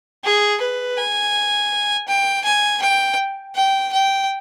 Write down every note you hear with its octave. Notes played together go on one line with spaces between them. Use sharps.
G#4
B4
G#5
G5
G#5
G5
G5
G5